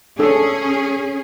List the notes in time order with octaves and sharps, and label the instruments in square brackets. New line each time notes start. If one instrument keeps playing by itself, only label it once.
[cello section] C#4 G#4 [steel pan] D4 A4